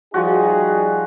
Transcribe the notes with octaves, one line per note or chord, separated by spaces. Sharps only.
F3 G3 D#4 F#4 G#4